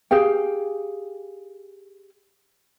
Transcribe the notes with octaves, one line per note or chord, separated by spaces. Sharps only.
G4 G#4 F5 G5